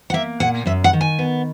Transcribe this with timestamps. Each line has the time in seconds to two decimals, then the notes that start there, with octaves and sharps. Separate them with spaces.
0.10 F#5
0.14 A#3 E5
0.40 A#2 F#5
0.66 F#2 E5
0.84 F#5
0.93 D#3
1.01 G#5
1.19 B3